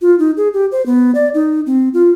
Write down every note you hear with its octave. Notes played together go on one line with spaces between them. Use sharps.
F4
D#4
G#4
G4
C5
B3
D5
D#4
C4
F4